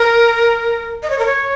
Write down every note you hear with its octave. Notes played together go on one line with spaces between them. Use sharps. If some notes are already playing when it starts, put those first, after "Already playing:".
Already playing: A#4
D#5
C#5
A#4
C#5